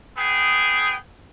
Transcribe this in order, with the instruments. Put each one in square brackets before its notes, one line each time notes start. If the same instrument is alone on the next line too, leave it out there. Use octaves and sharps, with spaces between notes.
[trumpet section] B3 G#4 G5